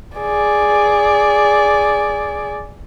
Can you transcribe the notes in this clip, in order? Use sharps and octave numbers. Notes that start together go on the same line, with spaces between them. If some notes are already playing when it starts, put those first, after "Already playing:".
G#4 D5